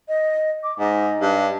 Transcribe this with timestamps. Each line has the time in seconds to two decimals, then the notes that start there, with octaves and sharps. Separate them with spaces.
0.08 D#5
0.63 D6
0.79 G#2 D#5
1.21 G2